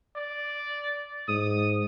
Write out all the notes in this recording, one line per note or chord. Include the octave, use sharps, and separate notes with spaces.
D5
G#2 D#6